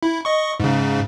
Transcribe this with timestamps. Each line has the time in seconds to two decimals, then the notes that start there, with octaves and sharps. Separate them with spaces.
0.03 E4
0.25 D#5 C#6
0.60 G#2 C#3